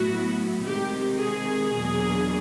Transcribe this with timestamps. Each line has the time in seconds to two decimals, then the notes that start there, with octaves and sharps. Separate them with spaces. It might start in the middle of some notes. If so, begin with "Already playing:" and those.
Already playing: A2 F#3 B3 E4 F#4
0.65 C3 D#3 G#3 G4
1.20 G#4
1.75 E2 B2 F#3 A#3 D4